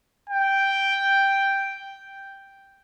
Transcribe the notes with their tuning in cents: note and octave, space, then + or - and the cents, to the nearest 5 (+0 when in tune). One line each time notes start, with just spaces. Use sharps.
G5 +0